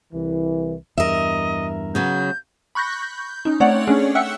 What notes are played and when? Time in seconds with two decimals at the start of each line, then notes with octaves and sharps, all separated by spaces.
0.13 C2 E3
0.98 E2 G2 A#4 D#5 E5
1.95 C#3 F#3 B3 G6
2.75 B5 C#6 F#6 G6 A#6
3.02 G6
3.45 C#4 D#4
3.60 A3 C4 C#5 D5 F#5
3.87 A3 C#4 D4 G#4
4.15 E5 F#5 G5 E6 F#6 C#7